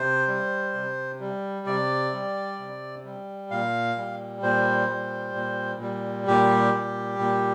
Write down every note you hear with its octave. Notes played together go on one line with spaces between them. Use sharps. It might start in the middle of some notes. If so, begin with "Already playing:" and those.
Already playing: C3 C5
G3
C3
G3
C3 D5
G3
C3
G3
A#2 F5
G3
A#2 C5
G3
A#2
G3
A#2 G4
G3
A#2